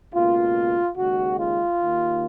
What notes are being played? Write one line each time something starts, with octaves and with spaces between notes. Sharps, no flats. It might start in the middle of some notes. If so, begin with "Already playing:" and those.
C#2 B2 A#3 F4
D#2 C#3 G#3 F#4
F4
D#2 D#3 A#3